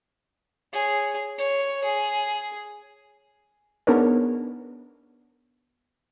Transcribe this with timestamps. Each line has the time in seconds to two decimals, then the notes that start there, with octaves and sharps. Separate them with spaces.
0.73 G#4 C#5
1.38 C#5
1.84 G#4
3.87 B3 D4 D#4 G#4 A#4 C#5